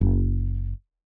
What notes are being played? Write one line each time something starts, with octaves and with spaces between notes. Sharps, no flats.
F#1